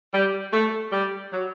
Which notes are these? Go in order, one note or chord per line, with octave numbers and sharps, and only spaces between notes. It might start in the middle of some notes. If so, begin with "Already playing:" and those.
G3
A3
G3
F#3